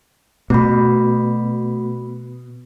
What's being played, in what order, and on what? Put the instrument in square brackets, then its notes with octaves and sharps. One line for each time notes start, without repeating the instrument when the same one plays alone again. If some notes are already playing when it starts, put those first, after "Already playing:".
[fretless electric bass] B2 [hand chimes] A3 F#4 B5